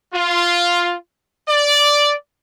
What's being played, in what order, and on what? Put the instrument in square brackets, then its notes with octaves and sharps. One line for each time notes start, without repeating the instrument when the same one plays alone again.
[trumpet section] F4
D5